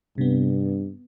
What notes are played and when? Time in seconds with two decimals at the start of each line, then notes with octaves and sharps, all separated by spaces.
0.18 G2 C3 B3